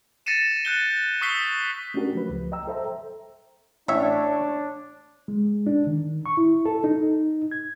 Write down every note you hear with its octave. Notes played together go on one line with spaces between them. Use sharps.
A6 A#6 C7 C#7 D#7 E7
F#6 G6 G7
C#6 D#6 E6 B6 C7 G7
A3 C#4 D4 F#4 G4 A#4
F3 A3 B4
C#2
D#5 G5 A#5 E6
A4 C5 E5 G5 A#5
A1 D4 C#5 E5
G#3
D4
D#3
C#6
E4
A4
D#4
G#6